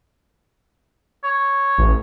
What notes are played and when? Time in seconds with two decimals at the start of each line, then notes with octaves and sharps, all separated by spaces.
1.24 C#5
1.78 A1